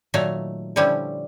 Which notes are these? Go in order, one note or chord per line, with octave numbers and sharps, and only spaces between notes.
A#2 D#3 F#3 A3 F5
D3 F3 G3 C#4 E4